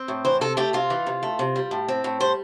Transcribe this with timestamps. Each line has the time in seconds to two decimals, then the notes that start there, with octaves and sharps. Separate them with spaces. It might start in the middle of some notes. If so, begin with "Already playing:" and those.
Already playing: C4
0.08 A2
0.25 E3 C5
0.41 C3 A4
0.57 A3 G4
0.73 C3 F4
0.90 E3
1.07 C3
1.23 A3
1.39 C3
1.56 G3
1.71 A2
1.88 C4
2.04 A2
2.20 G3 C5